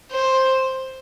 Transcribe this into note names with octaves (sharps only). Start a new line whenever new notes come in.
C5